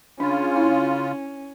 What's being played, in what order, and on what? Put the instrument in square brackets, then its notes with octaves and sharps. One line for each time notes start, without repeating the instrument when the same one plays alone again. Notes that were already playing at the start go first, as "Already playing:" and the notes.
[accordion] C#3 F4 [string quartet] C#4 [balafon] D4
[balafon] E4